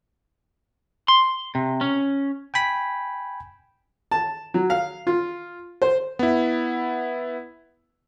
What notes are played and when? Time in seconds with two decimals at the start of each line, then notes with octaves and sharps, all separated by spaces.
1.08 C6
1.55 C3
1.81 C#4
2.54 G5 G#5 B5 B6
4.11 A5
4.54 F#3
4.70 F5
5.07 F4
5.82 C5
6.19 B3 E4